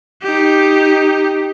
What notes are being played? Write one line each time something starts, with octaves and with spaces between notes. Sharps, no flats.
D#4 G4